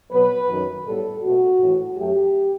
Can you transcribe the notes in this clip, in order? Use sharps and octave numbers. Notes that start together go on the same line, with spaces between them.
B2 F#3 B3 B4
F#2 D#3 F#3
A2 G3 B3 A4
B2 A3 F#4
A2 E3 A3
F#2 F#3 A3 G4